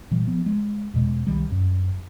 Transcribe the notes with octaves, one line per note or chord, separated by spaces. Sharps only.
A#2 E3 G3
F3 B3
G#3
E2 B2 G#3
C2 D#3 G3
F#2